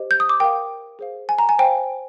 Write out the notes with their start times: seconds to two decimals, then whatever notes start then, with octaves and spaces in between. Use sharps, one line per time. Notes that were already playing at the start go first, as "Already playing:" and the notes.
Already playing: G4 C5 D#5
0.11 G6
0.20 D#6
0.29 D6
0.40 A#4 F5 G5
0.99 G#4 C5 F5
1.29 G#5
1.39 A#5
1.49 G#5
1.59 C5 F5 G5